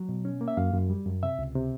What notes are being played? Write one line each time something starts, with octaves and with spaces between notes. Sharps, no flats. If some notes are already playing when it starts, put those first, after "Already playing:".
Already playing: F#3
B2
C#4
A#3
E5
F#2 F5
F#2
G3
F#2
C3 E5
C#2
C3